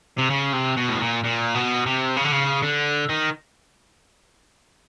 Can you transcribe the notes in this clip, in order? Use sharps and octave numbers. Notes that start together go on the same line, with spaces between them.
C3
C#3
C3
B2
A2
A#2
A#2
B2
C3
C#3
D3
C#3
D3
D#3